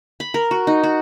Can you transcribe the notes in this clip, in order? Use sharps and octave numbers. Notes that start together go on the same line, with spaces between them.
B5
A#4
F#4
D#4
F#4